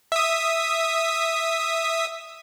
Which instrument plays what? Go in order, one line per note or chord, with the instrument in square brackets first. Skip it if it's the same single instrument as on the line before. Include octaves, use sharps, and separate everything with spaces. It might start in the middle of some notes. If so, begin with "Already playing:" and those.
[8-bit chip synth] E5 D#6